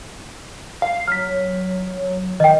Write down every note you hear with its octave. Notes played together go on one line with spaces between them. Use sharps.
F5
F#3 F6 B6
D#3 D#5 G5